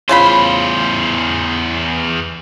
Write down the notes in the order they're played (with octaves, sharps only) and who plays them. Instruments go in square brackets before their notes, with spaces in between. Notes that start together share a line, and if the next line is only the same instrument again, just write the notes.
[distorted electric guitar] E2 C5 [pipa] C#3 F4 B5